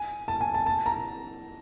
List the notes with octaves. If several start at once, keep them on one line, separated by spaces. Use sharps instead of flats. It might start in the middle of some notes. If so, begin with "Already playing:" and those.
Already playing: G#5
A5
G#5
A5
A5
A#5